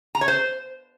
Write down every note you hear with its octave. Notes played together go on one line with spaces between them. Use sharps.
A#5
C#5
C5